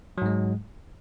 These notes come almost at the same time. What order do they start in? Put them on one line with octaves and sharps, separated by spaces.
F#3 G#2 G#3